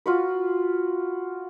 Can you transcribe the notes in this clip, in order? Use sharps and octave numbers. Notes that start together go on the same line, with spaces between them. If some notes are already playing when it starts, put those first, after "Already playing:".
F4 F#4 B4